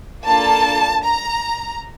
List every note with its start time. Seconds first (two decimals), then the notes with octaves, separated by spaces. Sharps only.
0.24 A#3 D4 F4 A4 A5
1.03 A#5